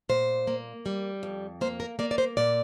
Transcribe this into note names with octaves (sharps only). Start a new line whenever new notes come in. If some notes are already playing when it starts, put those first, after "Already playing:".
A#2 C5
A#3
G3
F2
A#3 C5
A#4
A#3 D5
D5
C5
A#2 D5